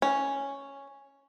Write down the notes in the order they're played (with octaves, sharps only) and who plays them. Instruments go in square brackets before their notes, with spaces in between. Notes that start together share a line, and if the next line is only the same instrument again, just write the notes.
[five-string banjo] C#4